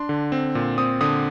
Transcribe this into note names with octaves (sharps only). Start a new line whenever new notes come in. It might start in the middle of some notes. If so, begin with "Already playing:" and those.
Already playing: D4 C6
D3
C4
A#2
C4 D#6
D3 D#6